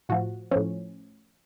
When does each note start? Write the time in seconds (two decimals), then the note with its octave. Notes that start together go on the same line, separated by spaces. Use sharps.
0.09 A2 F3 F#4
0.51 A2 F3 C#4